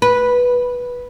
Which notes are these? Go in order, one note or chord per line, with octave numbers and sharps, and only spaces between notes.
B4